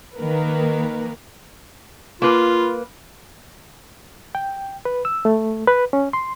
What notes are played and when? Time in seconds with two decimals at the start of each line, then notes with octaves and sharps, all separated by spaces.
0.16 D#3 A#3 A#4 B4
2.22 A#3 F4 B4
4.35 G5
4.85 B4
5.05 E6
5.25 A3
5.67 B4
5.93 C#4
6.13 C6